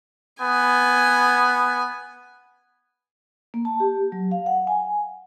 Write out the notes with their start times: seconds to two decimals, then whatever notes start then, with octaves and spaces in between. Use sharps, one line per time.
0.41 B3 G#5
3.54 A#3
3.65 A5
3.80 G4
4.12 F#3
4.31 F5
4.46 F#5
4.67 G#5